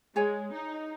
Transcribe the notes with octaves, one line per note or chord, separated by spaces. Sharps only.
G#3 G#4 C#5 G#5
D#4